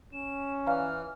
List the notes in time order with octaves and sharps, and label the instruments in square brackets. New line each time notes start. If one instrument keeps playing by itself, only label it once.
[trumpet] C#4 [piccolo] E7
[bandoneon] E3 [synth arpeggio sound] D5 F5 A#5 [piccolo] F6